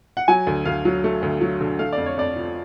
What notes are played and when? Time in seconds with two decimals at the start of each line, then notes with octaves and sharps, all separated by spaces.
0.17 F#5
0.28 F#3 G#5
0.47 D2
0.65 D2 F5
0.85 F#3
1.04 A3
1.22 D2
1.41 F#3
1.61 D3
1.79 A3 F5
1.93 D5
1.98 F2
2.06 C#5
2.18 F2 D5
2.36 F3